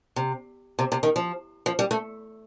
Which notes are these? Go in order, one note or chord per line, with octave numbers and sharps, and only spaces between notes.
C3
C3
C3
D#3
F3
F3
G3
A3